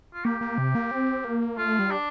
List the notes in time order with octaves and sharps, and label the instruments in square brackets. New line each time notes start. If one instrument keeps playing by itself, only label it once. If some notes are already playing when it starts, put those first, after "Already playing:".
[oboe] F4
[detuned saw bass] A#3 [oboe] G4
[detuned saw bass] A#3
C3
A#3
C4
A#3
[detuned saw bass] A3 [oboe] F4
[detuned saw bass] G3
[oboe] D4